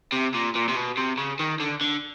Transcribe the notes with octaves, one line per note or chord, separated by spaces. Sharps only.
C3
A#2
A#2
C3
B2
C3
C#3
D#3
D3
D3